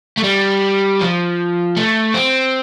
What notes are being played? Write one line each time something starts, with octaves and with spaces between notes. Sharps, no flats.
A3
G3
F3
A3
C4